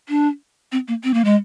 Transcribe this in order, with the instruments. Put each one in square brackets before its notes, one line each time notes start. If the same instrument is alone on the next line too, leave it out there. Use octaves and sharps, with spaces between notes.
[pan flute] D4
C4
A#3
C4
A#3
G#3